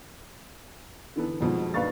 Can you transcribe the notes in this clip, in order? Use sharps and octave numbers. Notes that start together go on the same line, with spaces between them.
D3 E3 B3 A4
F2 B2 F3 G#3
B1 D4 B4 F5 C#6 A6